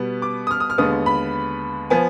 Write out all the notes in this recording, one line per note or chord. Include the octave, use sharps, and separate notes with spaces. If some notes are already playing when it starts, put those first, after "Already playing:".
Already playing: B2 G3 B3
D6
D#6
F6
D#6
F6
D#2 D3 G#3 B3 D#6
B5
F3 B3 G#5